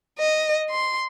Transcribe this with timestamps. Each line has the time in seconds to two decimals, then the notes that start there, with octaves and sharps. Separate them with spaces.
0.19 D#5
0.70 C6